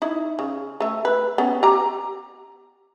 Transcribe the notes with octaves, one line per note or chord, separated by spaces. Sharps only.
D#4 E4
C#3
A3 E5
B4
B3 C#4
G4 A#5